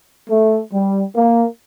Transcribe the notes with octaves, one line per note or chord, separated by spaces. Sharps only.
A3
G3
A#3